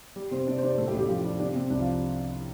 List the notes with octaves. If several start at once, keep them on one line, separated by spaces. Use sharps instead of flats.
G3
C3 C4 C5
C3 D4 D5
C5
C3 D4 D5
C5
A2 A3 A4
G3 G4
A1
G3 G4
F3 G3 F4
G3 D4
C3 D4
C3 C4
C2 D4
F3 F4